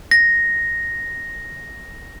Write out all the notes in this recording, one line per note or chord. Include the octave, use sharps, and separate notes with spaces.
A#6